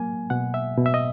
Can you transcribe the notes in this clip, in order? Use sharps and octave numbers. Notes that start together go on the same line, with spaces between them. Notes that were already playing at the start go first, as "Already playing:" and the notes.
Already playing: F#3 A#3 G#5
B2 F#5
E5
B2
E5
D#5